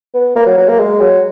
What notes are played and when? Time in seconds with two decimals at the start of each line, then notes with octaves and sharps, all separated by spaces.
0.14 B3
0.36 A#3
0.46 F#3
0.58 F#3
0.68 A#3
0.79 G#3
1.00 F#3